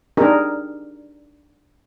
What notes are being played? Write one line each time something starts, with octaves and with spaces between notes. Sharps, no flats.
D4 D#4 G4 G#4 A#4 D5